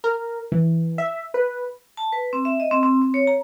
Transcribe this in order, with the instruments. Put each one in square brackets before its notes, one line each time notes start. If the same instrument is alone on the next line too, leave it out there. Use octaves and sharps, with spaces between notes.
[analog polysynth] A#4
E3
E5
B4
[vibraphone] A5
B4
C4
E5
D#5
C4
C4
C4
C#5
A#5